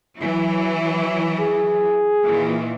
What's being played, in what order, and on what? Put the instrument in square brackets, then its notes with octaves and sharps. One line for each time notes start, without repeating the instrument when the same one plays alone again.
[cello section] E3 F#3 E4
[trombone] G#4
[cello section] A#2 D#3 E3